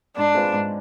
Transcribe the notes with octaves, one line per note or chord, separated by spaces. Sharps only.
G#2 D4
G#3 C4 F4 B4
G#2